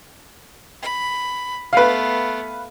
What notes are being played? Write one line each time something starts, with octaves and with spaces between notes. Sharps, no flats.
B5
A3 B3 B4 F5